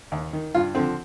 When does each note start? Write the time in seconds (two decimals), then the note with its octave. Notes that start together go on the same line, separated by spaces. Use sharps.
0.12 D#2
0.33 D#3
0.55 G2 F4
0.75 D3 F3 C4